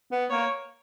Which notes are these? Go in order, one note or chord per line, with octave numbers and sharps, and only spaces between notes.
B3
A#3 C#5